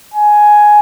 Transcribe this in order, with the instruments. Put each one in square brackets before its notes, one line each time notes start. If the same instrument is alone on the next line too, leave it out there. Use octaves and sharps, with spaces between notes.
[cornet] G#5